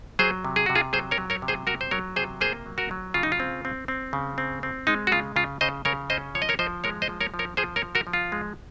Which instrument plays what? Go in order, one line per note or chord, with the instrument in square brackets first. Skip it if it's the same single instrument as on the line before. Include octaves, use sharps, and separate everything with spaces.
[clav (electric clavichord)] F#3 G#4 C5
C3
G#4
C3 F#4
F4 G#4
F#3 G#4 C5
A#4 C#5
F#3
A#4 C#5
C3
G#4 C5
F#3 F#4 A#4
C5
F#3 A#4 C#5
C3 G#4 C5
A#3 G#4 C5
F#3
F#4 A#4
F#3
C#3 F4
D#4
F4
C4
C4
C4
C#3
C4
C4
G#3 D#4
F#4
C#3 F4
C#3 F4
C#3 C5 D#5
C#3 A#4 C#5
C#4 C5 D#5
F3 C#5
D#5
A#4 C#5
F3 C5 D#5
G#3 A#4 C#5
C5 D#5
F3
A#4 C#5
F3
A#4 C#5
F3 G#4 C5
A#4 C#5
F3
F#4 A#4
F3
F4
G#3